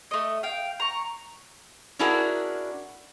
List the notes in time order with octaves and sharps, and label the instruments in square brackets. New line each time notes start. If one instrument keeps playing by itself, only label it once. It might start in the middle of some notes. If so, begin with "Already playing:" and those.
[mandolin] A3 D#5
F5 G5
A#5 C#6
[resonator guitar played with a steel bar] C#4 D4 E4 F#4 G#4 A#4